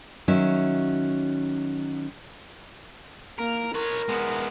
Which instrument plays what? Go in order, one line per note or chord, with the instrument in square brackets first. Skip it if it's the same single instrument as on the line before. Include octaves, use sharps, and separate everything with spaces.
[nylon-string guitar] D#3 F#3 C#4 E5
[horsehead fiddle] A#3 [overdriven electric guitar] A#4
[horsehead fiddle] A#4 [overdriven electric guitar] B4 C#5
[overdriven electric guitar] G#3 B3